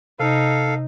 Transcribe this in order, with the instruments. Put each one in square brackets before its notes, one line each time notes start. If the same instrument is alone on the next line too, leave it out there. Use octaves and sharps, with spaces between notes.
[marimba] C3 [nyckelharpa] D#4 [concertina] A4 F5